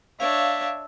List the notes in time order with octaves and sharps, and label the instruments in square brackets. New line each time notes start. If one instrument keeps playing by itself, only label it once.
[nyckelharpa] D4 C#5 [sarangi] E5 [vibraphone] F5